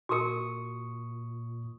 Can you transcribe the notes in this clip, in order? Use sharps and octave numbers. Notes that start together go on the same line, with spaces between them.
A#2 F#4 A#4 C#6 D#6 C#7